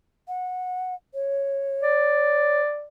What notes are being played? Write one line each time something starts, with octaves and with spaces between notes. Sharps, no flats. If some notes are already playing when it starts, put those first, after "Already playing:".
F#5
C#5
D5